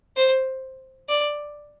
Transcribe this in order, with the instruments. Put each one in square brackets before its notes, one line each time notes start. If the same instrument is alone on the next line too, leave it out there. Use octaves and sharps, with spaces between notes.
[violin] C5
D5